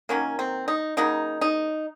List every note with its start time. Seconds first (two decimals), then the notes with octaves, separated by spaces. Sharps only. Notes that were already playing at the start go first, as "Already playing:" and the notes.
0.09 D#3 F#3 A#3 C#4
0.39 C4
0.68 D#4
0.97 C#3 F#3 A#3 D#4
1.41 D#4